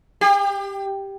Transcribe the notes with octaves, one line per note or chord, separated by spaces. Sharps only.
G4